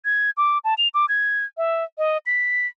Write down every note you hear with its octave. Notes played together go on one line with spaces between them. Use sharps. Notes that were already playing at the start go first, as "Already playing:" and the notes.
G#6
D6
A5
F7
D6
G#6
E5
D#5
B6